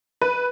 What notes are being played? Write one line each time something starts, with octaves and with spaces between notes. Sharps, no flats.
B4